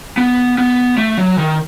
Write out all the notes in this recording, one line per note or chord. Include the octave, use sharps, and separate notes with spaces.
B3
B3
A3
F#3
D#3